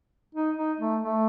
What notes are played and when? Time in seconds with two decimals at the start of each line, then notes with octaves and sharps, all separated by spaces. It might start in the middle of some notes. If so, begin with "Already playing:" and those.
0.35 D#4
0.57 D#4
0.80 A3
1.02 A3